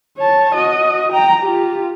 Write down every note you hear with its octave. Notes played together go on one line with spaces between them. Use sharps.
C#5 A5
F#4 D#5
G5 A#5
F4 G4